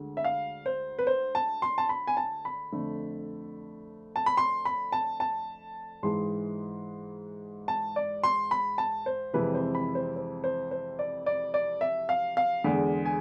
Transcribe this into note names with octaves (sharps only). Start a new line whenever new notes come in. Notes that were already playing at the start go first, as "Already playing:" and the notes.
Already playing: D2 D3 G#3
E5
F5
C5
B4
C5
A5
C6
A5
B5
G#5
A5
B5
F2 D3 A3
A5
B5
C6
B5
A5
A5
G#2 E3 G#3 C6
A5
D5
C6
B5
A5
C5
F2 C3 E3 G#3 B4
C5
B5
C5
C5
C5
C5
D5
D5
D5
E5
F5
F5
E2 D3 G#3
G#5